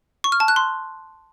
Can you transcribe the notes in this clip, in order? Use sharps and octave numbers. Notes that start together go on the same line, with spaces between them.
C#6
F6
A5
F#6
C6